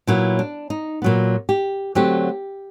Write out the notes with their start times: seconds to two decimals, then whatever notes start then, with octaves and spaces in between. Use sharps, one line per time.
0.07 A#2 F#3 B3 E4
0.39 D4
0.70 D#4
1.02 A#2 F#3 B3
1.49 G4
1.95 D3 F#3 A3 C4 G4